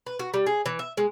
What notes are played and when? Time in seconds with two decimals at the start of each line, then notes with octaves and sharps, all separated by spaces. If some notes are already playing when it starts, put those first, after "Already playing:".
0.06 B4
0.19 F#4
0.34 G3
0.46 G#4
0.66 E3
0.79 E5
0.97 G#3